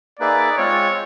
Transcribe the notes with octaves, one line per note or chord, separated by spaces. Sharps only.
A#3 D#4 G#4 B4 D5 E5
G#3 C4 F4 C#5